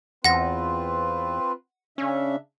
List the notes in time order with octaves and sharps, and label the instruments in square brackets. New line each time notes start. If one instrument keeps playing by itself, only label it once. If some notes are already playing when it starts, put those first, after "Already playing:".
[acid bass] E2 [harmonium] C4 F4 B4 [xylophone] F#5 A#6
[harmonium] C#3 D4 E5 [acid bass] C#4